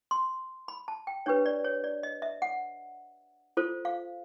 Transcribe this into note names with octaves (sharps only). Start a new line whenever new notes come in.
C6
B5
A5
G5
D4 G4 B4 C#5
D5
C#5
D5
D#5
E5
F#5
F4 A4 C5
F5